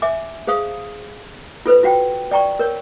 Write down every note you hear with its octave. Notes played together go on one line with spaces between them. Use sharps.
E5 G#5 D6
G#4 C5 F5 D#6
F4 A4 B4 C5
F4 F#4 F#5 G5
D5 G5 A#5 C#6
A#4 C#5